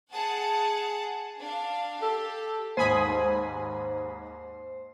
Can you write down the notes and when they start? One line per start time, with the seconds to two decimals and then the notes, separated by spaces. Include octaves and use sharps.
0.13 G#4 F#5 A5
1.40 D4 F5
2.02 G4 A4
2.77 D#2 G#2 C5 G#5 B5 D#6